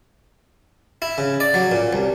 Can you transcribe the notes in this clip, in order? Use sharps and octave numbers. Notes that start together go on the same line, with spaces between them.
E4
C#3
D5
F#3
A#2
C2